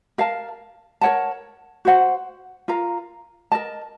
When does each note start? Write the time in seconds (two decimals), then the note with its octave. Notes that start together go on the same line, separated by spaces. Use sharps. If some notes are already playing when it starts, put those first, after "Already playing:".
0.18 A#4 F5 A5
1.01 A#4 C#5 F#5 A5
1.85 F#4 C5 F#5
2.68 F4 A#4 F5 A#5
3.52 A#4 D#5 A5